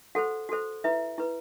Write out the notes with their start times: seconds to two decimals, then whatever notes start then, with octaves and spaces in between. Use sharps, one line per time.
0.15 F#4 A4 C5 F#5
0.49 F#4 A4 C5
0.84 E4 B4 E5
1.18 E4 B4